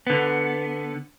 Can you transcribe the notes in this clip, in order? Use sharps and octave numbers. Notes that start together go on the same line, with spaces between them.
D3 B3